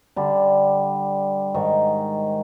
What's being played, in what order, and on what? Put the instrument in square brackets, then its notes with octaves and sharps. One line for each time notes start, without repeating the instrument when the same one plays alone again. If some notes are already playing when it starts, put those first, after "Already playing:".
[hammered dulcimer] D3 G3
G#2 D#3 C#6